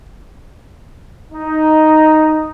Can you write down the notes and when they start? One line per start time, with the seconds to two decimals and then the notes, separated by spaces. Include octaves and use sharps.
1.32 D#4